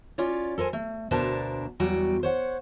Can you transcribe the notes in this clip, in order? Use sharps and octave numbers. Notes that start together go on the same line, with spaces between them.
C#4 F4 C#5 D5
A4 A#4 C5 G#5
A3
D2 B2 D4 A#4 C5 A5
E2 F#3 G3 F#4 G5
C5 C#5 F#5